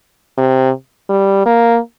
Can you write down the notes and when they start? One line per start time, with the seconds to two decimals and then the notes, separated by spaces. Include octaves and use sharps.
0.38 C3
1.09 G3
1.46 A#3